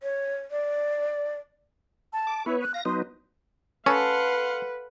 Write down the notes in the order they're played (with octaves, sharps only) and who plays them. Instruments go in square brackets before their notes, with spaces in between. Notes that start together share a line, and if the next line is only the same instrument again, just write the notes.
[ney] C#5
D5
[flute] A5
[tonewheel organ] D6
[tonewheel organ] B3 B4 C#5 [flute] E4
[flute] F#6
[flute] F5 [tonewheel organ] A#6
[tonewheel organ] F#3 B3 D#4 [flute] C6
[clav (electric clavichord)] C#4 [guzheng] A4 [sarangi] B4 [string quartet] F5 F#5 C6